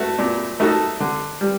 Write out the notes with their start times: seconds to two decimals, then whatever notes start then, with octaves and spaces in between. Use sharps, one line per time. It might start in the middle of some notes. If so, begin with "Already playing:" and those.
Already playing: A3 F#4 A4
0.18 A#2
0.60 A3 D#4 F#4 A4
1.00 D3
1.41 G3